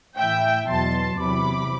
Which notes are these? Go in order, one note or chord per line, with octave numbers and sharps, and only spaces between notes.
A2 E3 E5 G5
E2 B2 F#3 A5 C6
E2 C3 F#3 B5 D6